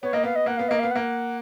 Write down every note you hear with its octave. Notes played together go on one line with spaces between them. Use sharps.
B3 C#5
A#3 D#5
B3 F5
D#5
A#3 F#5
B3 F5
A#3 D#5
B3 F5
A#3 F#5